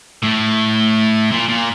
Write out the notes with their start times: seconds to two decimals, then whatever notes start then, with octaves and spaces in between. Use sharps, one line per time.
0.23 A2
1.31 A#2
1.49 A#2